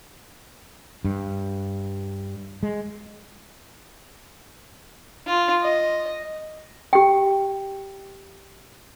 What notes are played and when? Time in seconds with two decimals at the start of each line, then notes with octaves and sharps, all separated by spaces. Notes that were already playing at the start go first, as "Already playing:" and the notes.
1.05 G2
2.63 G#3
5.26 F4
5.62 D#5
6.93 G4 G5